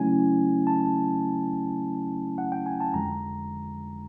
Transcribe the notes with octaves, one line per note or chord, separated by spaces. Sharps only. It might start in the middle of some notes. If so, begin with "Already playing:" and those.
Already playing: C#3 F#3 A3 C#4 E4 G#5
A5
F#5
G5
G#5
A5
F2 D3 F3 G#3 A#5